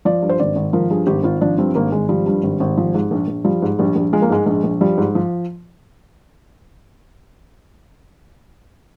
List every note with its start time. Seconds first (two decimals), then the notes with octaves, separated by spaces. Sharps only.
0.05 F3 D5
0.22 G2
0.29 C5
0.40 G#1 D5
0.56 G#1
0.73 F3 A#4
0.90 G2 G#4
1.07 G#1 G4
1.24 G#1 F4
1.41 F3 D4
1.58 G2 C4
1.75 G#1 A#3
1.92 G#1 G#3
2.09 F3 G3
2.26 G2
2.43 G#1
2.60 G#1
2.78 F3
2.94 G#2
3.11 A#1
3.27 A#1
3.45 F3 G3
3.62 G#2
3.79 A#1 G3
3.96 A#1
4.13 F3 G#3
4.22 A#3
4.29 G#2 G#3
4.46 A#1 G#3
4.64 A#1
4.81 F3 G3
4.98 G#2
5.15 F3